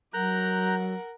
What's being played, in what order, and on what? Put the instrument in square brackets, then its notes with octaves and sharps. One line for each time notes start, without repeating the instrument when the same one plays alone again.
[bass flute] F#3 [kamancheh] A#4 F#5 [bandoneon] A#5 F#6 G6